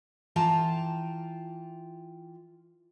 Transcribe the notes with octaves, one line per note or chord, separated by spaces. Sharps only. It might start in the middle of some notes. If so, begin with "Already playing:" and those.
E3 F4 G5 A5 A#5